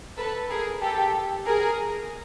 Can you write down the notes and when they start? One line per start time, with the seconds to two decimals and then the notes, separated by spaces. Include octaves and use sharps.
0.17 A4 B4
0.50 G#4 A#4
0.81 G4 A4
1.45 G#4 A#4